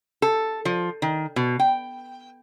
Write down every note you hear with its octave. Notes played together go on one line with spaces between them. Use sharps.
A4
F3
D#3
B2
G5